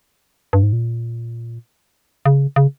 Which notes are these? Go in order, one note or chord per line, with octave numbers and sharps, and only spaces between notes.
G2
G#2
A#2
C#3
C#3